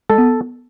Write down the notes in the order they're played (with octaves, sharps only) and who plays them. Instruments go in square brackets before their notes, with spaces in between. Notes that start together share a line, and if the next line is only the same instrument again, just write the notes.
[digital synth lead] G#3 [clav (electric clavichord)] A4
[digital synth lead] B3